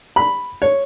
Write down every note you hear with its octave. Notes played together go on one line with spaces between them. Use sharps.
B5
C#5